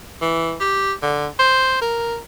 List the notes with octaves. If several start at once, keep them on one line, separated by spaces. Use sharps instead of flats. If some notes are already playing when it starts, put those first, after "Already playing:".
E3
G4
D3
C5
A#4